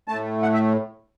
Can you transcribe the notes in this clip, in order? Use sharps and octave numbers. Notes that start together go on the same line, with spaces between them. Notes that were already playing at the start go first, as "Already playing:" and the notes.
A2 A3 A5
F#5
E5